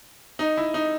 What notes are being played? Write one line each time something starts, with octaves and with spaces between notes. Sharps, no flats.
D#4
E4
D#4